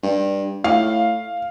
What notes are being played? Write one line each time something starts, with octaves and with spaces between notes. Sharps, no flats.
G2
A2 F5